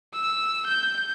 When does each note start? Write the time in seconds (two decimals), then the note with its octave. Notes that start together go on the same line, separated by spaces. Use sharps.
0.14 E6
0.66 G6